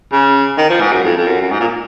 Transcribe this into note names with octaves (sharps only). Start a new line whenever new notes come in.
C#3
D#3
F3
G#2
F#2
F2
F2
F#2
F#2
G#2
A#2